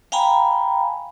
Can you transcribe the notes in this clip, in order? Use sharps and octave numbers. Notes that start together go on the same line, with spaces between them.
F5 G5 G#5 A#5 B5